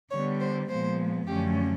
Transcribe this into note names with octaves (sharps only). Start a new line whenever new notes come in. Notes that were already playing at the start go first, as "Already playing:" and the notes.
D3 G3 B3 C#5
C5
A#2 F3 G#3 B3 C5
F#2 D3 F3 A3 C#4 G4